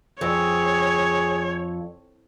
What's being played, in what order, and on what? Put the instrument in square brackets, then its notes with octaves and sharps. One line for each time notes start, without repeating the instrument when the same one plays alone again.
[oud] F2 [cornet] G#4 [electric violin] C#5